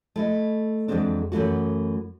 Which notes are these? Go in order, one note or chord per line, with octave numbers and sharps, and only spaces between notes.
A3 E4 D#5
F2 E3 F#3 G#3 C4 D4
F#2 E3 A3 F#4